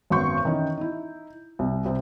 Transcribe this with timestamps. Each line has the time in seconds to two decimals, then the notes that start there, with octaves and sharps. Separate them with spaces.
0.10 G#1 F#2 B3 C6 C#6 G6
0.45 D#3 E3 C#4
0.78 D#4 E4
1.59 C2
1.85 C2 C4